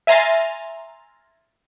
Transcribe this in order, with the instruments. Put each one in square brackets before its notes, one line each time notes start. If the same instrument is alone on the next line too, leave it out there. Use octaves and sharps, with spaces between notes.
[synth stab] E5 G#5 A#5 C6 F6 A6